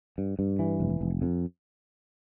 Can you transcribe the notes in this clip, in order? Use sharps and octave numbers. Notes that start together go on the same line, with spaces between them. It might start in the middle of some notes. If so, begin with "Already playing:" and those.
G2
G2
E3
F1
F1
F2